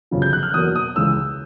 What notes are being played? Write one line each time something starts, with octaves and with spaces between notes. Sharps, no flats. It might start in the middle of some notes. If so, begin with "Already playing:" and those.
G1 F#2 C#3 F3
G6
F#6
F6
E2 B2 F#3 A#3 D#6
D#6
C#2 C#3 E3 G#3 E6